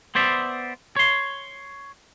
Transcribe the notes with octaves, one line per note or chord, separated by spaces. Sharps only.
B3 C5 D5 E5
C#5 C6